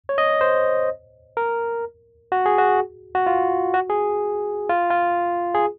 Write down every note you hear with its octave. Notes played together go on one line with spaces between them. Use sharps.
C#5
D#5
C5
A#4
F#4
G#4
F#4
F#4
F4
F#4
G#4
F4
F4
G#4